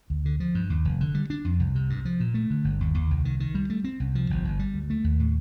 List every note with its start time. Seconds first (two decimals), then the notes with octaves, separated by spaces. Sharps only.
0.10 D2
0.25 D3
0.40 F3
0.55 G2
0.70 D#2
0.85 F1
1.01 D3
1.14 G3
1.30 D4
1.45 F2
1.60 C2
1.75 C3
1.90 G2
2.05 F3
2.20 A#2
2.34 A3
2.50 D3
2.64 G1
2.80 D#2
2.94 D#2
3.10 C2
3.25 D#3
3.40 D#3
3.55 G3
3.70 A3
3.84 C4
4.00 C2
4.15 F3
4.30 G1
4.45 G1
4.59 G3
4.74 D2
4.90 A3
5.04 D#2
5.20 A2